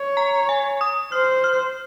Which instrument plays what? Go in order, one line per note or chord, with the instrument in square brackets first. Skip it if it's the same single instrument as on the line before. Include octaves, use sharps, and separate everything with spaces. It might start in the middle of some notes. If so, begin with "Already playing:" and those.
Already playing: [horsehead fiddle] C#5
[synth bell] A#5
G#5
D#6
[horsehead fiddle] C5 [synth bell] F6
[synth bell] F6